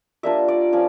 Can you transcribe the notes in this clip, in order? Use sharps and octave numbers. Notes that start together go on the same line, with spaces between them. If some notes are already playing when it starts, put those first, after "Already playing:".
G3 A#3 D4 F4 E5
D5
F3 C#4 F5